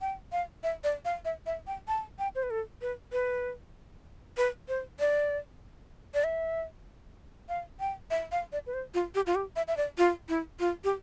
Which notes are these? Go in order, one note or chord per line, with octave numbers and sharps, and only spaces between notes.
G5
F5
E5
D5
F5
E5
E5
G5
A5
G5
C5
B4
A4
B4
B4
B4
C5
D5
D5
E5
F5
G5
E5
F5
D5
B4
C5
F4
G4
F4
G4
E5
E5
D5
F4
E4
F4
G4